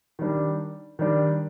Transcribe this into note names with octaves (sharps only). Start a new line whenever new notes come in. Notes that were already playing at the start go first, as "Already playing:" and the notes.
D#3 G3 D4
D#3 G3 D4